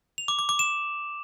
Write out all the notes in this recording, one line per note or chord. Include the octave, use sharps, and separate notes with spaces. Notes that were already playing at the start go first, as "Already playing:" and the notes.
F7
D6
D6
D6
E7